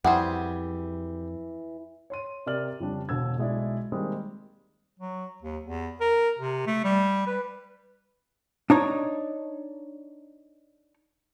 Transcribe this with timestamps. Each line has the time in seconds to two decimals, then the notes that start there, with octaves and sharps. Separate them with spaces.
0.05 F2 E3 G3 G#4 C5 F#5
2.10 C#5 C6 D#7
2.46 C3 G4 A#4 D5 F6 F#7
2.80 F2 C#3 G3 C#4 D4
3.09 E1 D3 E6 G#6
3.38 B1 G#3 E4 D5
3.92 D#3 G3 G#3 A#3 C4
5.00 F#3
5.43 D#2
5.65 E2
6.01 A#4
6.39 C3
6.67 A3
6.84 G3
7.27 B4
8.70 D4 D#4 C#5